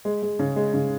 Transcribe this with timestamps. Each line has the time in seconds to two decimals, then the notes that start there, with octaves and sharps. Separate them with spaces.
0.05 G#3
0.23 G#3
0.39 C#3
0.56 G#3
0.74 C#3